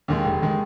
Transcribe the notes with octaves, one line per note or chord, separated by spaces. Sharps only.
D#2 D#3 G#3
F1
D#3 G#3